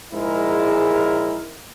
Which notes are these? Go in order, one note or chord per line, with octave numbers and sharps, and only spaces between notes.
A#1 G#2 G#3 E4 A#4